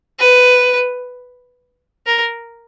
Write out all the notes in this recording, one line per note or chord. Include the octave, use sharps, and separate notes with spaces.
B4
A#4